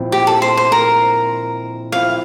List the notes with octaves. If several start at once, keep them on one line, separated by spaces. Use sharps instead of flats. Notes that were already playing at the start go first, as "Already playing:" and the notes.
Already playing: A#2 F3 C4 E4
G4
A4
C5
C5
A#4
F3 C4 E4 F5